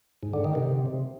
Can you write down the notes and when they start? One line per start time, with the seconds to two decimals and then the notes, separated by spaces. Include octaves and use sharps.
0.23 G#2
0.33 D3
0.44 D#3
0.55 C3